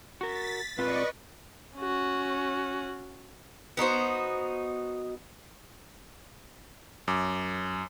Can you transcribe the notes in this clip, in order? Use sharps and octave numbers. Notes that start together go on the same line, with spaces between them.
F#4 A#4 A6 B6
A#2 C4 F4 B4 D5 D#5 C#6
C#4 F#4
B3 D#4 F#4 C5
F#2 D6